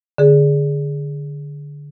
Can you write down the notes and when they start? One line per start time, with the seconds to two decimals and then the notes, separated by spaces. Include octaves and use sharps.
0.18 D3 G#4